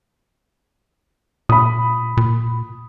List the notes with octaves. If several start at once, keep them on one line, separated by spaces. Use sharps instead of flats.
A#2 B5 D#6
A#2